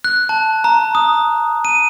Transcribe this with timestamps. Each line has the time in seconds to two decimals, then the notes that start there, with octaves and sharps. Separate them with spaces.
0.04 F#6
0.29 A5
0.64 A#5
0.95 D#6
1.65 D#7